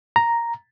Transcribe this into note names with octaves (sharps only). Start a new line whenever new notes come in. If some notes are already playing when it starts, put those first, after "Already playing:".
A#5